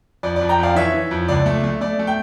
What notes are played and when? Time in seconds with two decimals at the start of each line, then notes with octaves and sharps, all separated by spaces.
0.23 F2 D5
0.36 D5
0.41 F2
0.49 G5 A#5
0.59 F2 D5 F5
0.75 E3 C#5 E5
0.94 E3
1.11 F2
1.28 C#2 D5
1.46 A3
1.63 A3
1.81 A3 D5
1.99 A3
2.07 G5